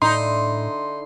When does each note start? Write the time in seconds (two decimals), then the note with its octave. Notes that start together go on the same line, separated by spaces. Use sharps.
0.02 A2 D3 D#4 E4 C6